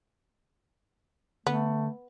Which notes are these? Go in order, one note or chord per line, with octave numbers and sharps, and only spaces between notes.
D3 A3 B3